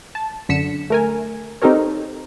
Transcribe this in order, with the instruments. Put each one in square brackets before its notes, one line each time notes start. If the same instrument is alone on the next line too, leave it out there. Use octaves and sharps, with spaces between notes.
[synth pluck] A5
F#2 D3 B6 C#7 E7
A3 A#4 G#5
C4 D#4 G4 A4 A#4 C#5